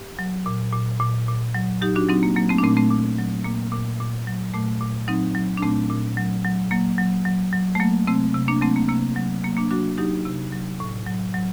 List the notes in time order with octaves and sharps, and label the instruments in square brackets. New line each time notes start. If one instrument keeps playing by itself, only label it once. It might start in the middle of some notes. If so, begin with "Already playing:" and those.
Already playing: [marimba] G4
F#3
A#2
A#2
A#2
A#2
F#3
F#3 D#4 G4
D4 F#4
F#3 C4 D#4
A#3
F#3 A#3
A3 C4
D4
A#2 A3 C4
A3 C4
A#2
F#3
A#2 A#3
A#2
A#2
F#3
A#2 A3
A#2
F#3 C4 D#4
F#3
D4
A#2 A3 C4
A#2
F#3
F#3
F#3 A#3
F#3
F#3
F#3
A3
F#3 A#3
C3 A3 C4
C3
A#3 D4
F#3 A3 C4
A#3
C3 A#3
F#3
F#3 A#3
A#3 D4
F#3 D4 F#4
F#3 D#4 G4
C3
F#3
A2
F#3
F#3